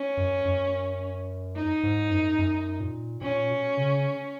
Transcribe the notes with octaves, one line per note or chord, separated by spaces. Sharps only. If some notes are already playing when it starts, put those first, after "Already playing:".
Already playing: C#4
F#2
F#2
D#4
G#2
F#2
F#2
A#2
A#2 C#4
B2
C#3